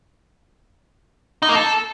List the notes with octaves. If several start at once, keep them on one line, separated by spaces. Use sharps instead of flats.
D#4
A#3
A4